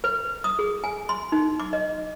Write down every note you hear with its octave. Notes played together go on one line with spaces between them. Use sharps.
B4
D#6
G#4
G#5
C6
D#4
D6
D#5